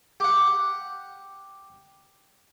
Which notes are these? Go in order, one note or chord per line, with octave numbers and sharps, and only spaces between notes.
G4 F#5